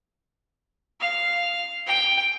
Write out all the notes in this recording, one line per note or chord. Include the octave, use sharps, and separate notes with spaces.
F5
G5